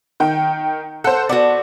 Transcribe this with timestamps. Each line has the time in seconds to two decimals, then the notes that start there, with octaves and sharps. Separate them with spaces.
0.20 D#3 G5
1.04 A4 C5 F#5
1.29 B3 F#4 A4 D5